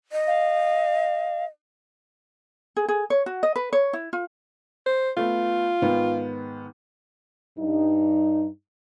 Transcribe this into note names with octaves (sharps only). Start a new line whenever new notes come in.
D#5
F5
G#4
G#4
C#5
F#4
D#5
B4
C#5
E4
F4
C5
A3 B3 F4
G#2 D#3 B3
G2 D#4